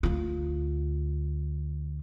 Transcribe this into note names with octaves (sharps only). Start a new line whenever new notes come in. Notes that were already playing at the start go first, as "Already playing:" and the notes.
D2 F4